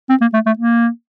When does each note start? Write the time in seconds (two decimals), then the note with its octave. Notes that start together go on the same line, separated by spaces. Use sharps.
0.09 C4
0.21 A#3
0.34 A3
0.46 A3
0.59 A#3